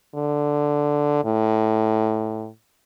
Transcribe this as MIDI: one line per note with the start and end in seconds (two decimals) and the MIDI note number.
0.15 1.21 50
1.25 2.49 45